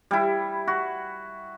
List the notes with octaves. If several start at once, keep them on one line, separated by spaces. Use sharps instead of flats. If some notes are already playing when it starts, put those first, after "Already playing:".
G3 E4
F#4